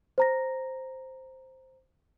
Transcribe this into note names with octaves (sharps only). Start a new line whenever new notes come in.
C5 A#5 A#6